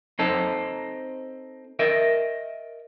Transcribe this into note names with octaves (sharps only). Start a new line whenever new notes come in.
C4 D#4 A4
A#4 D#5 E5